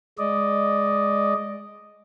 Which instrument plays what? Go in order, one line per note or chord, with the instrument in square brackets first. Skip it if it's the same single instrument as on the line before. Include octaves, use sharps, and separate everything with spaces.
[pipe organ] G#3 D5 D#5